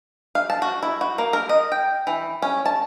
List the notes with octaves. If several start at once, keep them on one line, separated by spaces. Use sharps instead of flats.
F5
A5
F#4
E4
F#4
A#3
A#4
D#5
G5
E3
C#4
A5